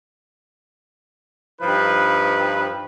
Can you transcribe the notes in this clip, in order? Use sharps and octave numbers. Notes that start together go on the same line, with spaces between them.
G2 F3 D#4 B4